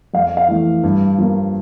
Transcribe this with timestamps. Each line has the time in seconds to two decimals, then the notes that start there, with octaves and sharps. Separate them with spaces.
0.14 F2 F5
0.37 F5
0.48 E3 A3
0.84 G2
1.18 F3 A#3